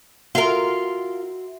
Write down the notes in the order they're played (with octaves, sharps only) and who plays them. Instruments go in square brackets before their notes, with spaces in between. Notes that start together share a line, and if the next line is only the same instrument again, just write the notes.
[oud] F4 A#4 [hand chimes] F#4 E5